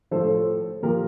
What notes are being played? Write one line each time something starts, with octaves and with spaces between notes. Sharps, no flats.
A2 F3 A4 C5
A#2 F3 G4 A#4